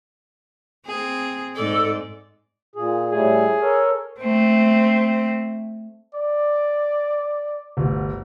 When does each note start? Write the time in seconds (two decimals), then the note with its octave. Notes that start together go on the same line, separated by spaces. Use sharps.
0.87 C4 G#4
1.56 G#2 A4 D5
2.76 A#2 G#4
3.12 A2 G3 A3 G#4
3.61 A4 A#4 C#5
4.20 A3 C4
6.15 D5
7.77 G1 D2